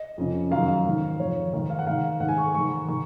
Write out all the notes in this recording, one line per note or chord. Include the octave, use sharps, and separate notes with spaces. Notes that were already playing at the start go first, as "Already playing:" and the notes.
Already playing: D#5
F2 C#3
F#2 D#3 F5
G#2 D#3
F2 D#3 C#5
G#2 D#3
F5
F#5
G#2 D#3 F5
G#2 D#3 F#5
G#5
C#6
G#2 D#3 C#6
D#3 C#6